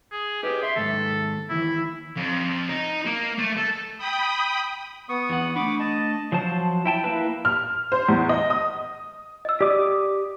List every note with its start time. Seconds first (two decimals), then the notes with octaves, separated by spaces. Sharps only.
0.12 G#4
0.43 G4 G#4 B4 D#5
0.63 E5 C6
0.76 D#2 G#2 A4
1.50 D#2 E3 E4
2.17 F2
2.69 D#4
3.05 A#3
3.39 A3
3.58 A4
3.98 G5 B5 D#6
5.09 B3 C#6 D#6
5.29 E2 F#5
5.56 A3 D4 B5 C#6 D6
5.79 D#5 A5
6.32 F3 F#3 C5 A5
6.86 E4 G5 A5
7.04 A#3 E4 B4
7.45 F6
7.92 C5
8.09 E2
8.29 D#5
8.50 D#6
9.45 D#5 E6
9.61 G4 D5 D6 D#6